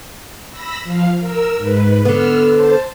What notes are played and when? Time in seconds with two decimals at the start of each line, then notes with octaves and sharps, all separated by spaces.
0.51 B5 E6 A#6
0.84 F3 F5
1.19 A#4 E6
1.58 G#2 B4
2.05 D3 B3 E6 F6
2.50 C5 A5